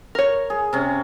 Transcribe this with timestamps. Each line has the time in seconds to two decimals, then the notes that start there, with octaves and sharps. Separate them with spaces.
0.15 A#4 C#5
0.50 G#4
0.73 C3 C#4